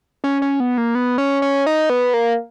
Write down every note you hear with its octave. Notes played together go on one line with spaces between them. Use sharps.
C#4
C#4
B3
A#3
B3
C#4
C#4
D#4
B3
A#3